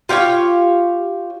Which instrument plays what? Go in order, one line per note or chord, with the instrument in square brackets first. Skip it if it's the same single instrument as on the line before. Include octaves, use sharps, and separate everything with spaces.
[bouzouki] F4 G4 C#5 F5